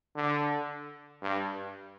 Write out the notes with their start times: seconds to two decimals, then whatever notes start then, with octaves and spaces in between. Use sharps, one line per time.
0.16 D3
1.22 G2